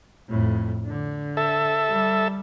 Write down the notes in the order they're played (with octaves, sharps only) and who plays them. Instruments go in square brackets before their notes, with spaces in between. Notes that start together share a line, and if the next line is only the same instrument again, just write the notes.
[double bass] F2 A2
D3
[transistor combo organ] A4 E5
[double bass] G3